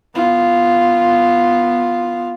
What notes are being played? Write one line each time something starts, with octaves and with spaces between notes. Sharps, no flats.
B3 F4